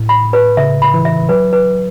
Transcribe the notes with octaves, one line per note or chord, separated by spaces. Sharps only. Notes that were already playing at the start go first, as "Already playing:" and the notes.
Already playing: A2
B5
B4
C#3 E5
B5
E3
E5
F#3 B4
B4